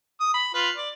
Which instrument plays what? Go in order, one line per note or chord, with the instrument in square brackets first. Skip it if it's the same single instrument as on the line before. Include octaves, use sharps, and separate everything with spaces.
[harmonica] D#6
B5
F4 B4
D5